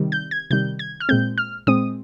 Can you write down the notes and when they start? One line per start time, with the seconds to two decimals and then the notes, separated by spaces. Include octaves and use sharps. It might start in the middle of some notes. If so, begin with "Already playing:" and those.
Already playing: C3 D#3 G3
0.12 G6
0.31 G#6
0.51 C3 D#3 G3 G6
0.79 G#6
1.00 F6
1.09 A#2 G#3 C4 G6
1.38 F6
1.67 A#2 G#3 C4 D#6